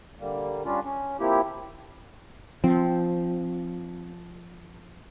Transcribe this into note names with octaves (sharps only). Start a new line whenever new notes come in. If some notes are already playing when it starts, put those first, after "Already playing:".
D3 G3 A#3
G3 C#4 D4 F4
C#4
F3 A#3 C4 E4 G4
F3 C4